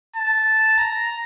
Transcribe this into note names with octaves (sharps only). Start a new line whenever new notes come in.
A5
A#5